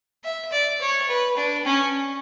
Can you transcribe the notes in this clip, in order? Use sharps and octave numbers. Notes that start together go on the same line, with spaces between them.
E5
D5
C#5
B4
D4
C#4